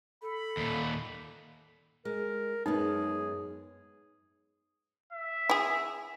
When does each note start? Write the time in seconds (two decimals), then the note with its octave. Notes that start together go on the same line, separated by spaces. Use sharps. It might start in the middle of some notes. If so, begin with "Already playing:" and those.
0.22 A4 B5
0.57 D#2 A#2
2.05 G#3 A#4
2.66 F#2 G#3 B3 D#4 G#4
5.13 E5
5.50 E4 G#4